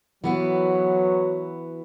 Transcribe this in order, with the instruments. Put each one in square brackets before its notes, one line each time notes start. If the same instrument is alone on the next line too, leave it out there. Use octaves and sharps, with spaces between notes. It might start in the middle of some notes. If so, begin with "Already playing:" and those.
[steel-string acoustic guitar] E3 B3 F#4 [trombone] F#3